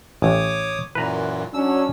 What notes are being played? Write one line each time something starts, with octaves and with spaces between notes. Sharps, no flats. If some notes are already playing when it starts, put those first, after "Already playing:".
A1 C#5 D6 D#6
F#2 A#2 E3 B4 A#5
F#3 C#4 D4 E6